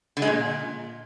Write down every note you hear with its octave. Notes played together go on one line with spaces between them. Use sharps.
D3
G#3
A#2